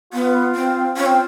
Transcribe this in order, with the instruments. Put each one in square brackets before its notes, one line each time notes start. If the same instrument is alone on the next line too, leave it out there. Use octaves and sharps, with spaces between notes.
[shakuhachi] B3 [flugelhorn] F4
[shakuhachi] C4
[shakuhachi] C#4 [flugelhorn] F4
[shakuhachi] C4